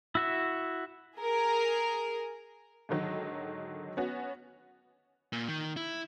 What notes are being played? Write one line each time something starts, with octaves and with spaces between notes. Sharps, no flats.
E4 F#4 E5
G#4 A#4
G#2 D3 D#3 F#3
B3 C#4 F#4
A#2
D#3
E4